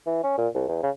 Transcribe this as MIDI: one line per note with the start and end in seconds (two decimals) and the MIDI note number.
0.06 0.20 52
0.23 0.37 61
0.38 0.48 46
0.55 0.67 36
0.68 0.82 40
0.83 0.90 49